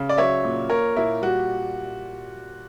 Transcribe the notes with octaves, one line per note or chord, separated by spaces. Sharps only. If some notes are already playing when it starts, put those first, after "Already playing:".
Already playing: C#3
D5
F#3 C#5 E5
A#2
A#2 A#4 C#5
A#2 E4
G3 F#4